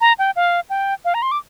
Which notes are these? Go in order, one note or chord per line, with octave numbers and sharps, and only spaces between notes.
A#5
G5
F5
G5
F5
A#5
C6
D6